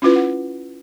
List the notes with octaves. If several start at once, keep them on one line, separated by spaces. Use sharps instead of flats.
C#4 E4 F4 B4
F#5